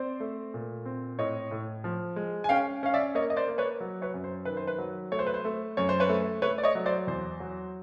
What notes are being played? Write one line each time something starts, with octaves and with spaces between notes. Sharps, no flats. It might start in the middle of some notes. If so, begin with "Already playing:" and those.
Already playing: C4 C5 D5
A3
A#2
C4
A2 C#5 D#5
A2
F3
G#3
G#5
C#4 F5 G5
C#4 F5
D5 E5
A#3 C#5 D#5
D#5
C5 D5
A#3
B4 C#5
F#3
B4 C#5
F#2
C5
D#3 B4
C5
B4
F#3
A3 C#5
C5
B4
C5
A3
F#2 C#5
C5
B4 C#5
A3
A3 B4 C#5
D5
C#5 D#5
F#3
C5 D5
E2 C5
F#3